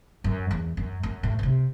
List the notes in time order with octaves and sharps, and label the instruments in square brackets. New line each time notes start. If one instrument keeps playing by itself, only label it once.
[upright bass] F#2
E2
F#2
F#2
A2
B2
C3